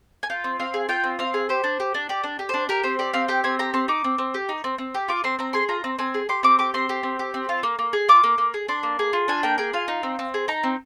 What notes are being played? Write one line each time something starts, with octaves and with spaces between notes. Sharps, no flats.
G#5
F4 G5
C4
C4 F5
G#4
F4 G5
C4
C4 F5
G#4
G4 C5
D4
G4
D4
G4 D5
D4
G4
D4 C5
G4 A#4
C4 C5
G4 D5
C4 F5
G4 G5
C4 G#5
G4 A#5
C4 C6
D#4 D6
C4
C4
G4
D#4
C4
C4
G4
F4 D6
C4 C6
C4 A#5
G#4 C6
F4 A#5
C4
C4 G#5
G#4
G4 C6
C4 D6
G4 D6
C4 C6
G4
C4
G4
C4
F4
A#3
A#3
G#4
F4 D6
A#3
A#3
G#4
D4 C6
A#3
G#4
F4
D4 G#5
A#3 G5
G#4 G5
F4 F5
D#4
C4
C4
G#4
D#4 A#5
C4